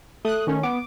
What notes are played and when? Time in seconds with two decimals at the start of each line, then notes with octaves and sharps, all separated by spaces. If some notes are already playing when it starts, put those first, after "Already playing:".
0.25 A3 D#6 F#6
0.47 D#3 C#4
0.63 B3 D6